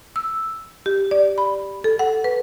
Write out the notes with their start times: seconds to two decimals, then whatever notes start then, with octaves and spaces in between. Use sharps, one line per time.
0.16 E6
0.86 G4
1.11 D5
1.38 B5
1.84 A4
1.99 F#5
2.24 B4